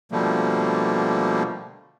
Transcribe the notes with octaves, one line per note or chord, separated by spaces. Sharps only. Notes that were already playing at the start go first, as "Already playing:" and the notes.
B2 D3 F3 G3 A3 A#3